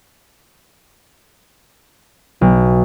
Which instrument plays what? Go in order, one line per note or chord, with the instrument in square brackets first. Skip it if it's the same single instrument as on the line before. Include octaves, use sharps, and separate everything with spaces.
[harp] B1